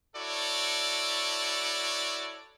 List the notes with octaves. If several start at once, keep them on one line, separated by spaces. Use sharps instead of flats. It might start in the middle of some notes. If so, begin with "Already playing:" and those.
E4 F#4 A4 C#5 D5